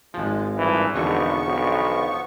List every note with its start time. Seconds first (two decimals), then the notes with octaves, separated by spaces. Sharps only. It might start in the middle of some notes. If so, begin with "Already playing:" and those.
0.14 G#1 F3 G#3
0.58 G2 A#2 E3
0.94 G#1 E2 B2 D3 F3 B3 C#6
1.46 B1